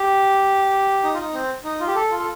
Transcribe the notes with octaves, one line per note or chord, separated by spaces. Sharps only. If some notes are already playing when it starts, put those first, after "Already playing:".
Already playing: G4
D#4
F4
D#4
C4
D#4
F4
G4
A4
F4
A4